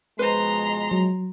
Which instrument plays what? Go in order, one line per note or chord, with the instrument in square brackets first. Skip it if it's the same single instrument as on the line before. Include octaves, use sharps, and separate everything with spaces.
[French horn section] B2 F3 G#3 [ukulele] B4 C5 [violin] A#5 C6
[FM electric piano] F#3